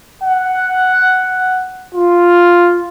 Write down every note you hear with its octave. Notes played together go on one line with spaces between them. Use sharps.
F#5
F4